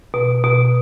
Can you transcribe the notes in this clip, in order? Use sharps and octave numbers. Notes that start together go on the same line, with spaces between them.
B2
B2